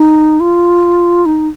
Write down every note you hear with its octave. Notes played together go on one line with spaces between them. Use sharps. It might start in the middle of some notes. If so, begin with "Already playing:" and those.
Already playing: D#4
F4
D#4